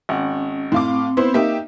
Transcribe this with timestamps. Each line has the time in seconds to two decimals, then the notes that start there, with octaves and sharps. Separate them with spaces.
0.09 G#1 C#4 F#5
0.72 A2 C4 F5 D6
1.17 B3 E4 C5
1.34 A#3 D#4 G4 E5